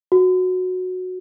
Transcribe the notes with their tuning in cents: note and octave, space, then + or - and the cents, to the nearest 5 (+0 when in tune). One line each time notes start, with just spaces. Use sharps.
F#4 -10